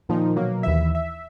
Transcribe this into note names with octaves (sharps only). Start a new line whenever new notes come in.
A#2 D#3 F3 D#4
B2 F#3 A#3
D#2 E3 E5
E5